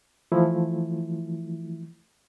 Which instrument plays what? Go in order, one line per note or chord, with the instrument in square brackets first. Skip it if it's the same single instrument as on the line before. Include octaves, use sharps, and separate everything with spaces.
[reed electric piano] E3 F3 A3 E4